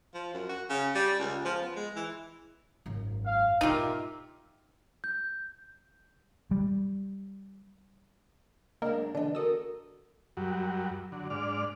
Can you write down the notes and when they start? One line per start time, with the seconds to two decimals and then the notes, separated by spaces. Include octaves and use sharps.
0.14 F3
0.34 F#2
0.49 F#4
0.70 C#3
0.95 G3
1.19 C#2
1.45 F3
1.62 B3
1.76 G#3
1.96 E3
2.86 G#1 F#2
3.26 F5
3.61 G#2 B2 D#4 F4 G4 A#4 E5
5.04 G6
6.51 G3
8.82 F#2 G#3 A#3 D4 A#4 D#5
9.15 D3 E3 D4 D#5
9.35 F#4 A4 A#4 D#6 E6
10.37 F#2 F#3 G3
11.12 D3 F#3
11.30 G#2 D4 D5 F6